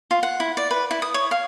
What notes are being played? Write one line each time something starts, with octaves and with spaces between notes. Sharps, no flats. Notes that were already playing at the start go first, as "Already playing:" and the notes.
F4
F#5
E4
D5
B4
E4
D#6
C#5
F5